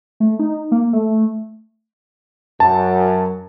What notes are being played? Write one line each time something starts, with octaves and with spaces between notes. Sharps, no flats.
A3
D#4
A#3
A3
F#2 A5